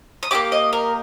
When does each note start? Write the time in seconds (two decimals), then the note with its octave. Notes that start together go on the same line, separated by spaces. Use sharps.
0.23 D#6
0.31 A#3 D#4 G4 D6
0.52 D#5
0.73 A#4